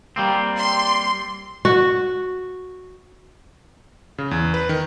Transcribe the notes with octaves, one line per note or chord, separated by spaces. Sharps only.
G3 A#3 C4
C6
F#4
C#3
E2
B4
D#3